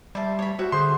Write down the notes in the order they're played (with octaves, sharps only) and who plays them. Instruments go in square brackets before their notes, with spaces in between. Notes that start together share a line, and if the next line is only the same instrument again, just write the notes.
[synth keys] G3 [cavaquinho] C5 E5 A5
[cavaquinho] C#5 B5
[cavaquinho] F#4 E5 [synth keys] C5
[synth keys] D3 G#4 C5 [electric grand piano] C6